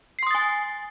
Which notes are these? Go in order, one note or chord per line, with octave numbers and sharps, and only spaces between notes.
G#5 C6 D#6 A6 C7